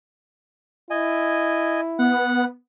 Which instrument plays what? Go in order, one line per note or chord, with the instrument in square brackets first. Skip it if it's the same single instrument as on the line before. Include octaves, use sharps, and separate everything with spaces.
[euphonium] E4 [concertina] D#5 G#5
[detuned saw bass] B3 [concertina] F#5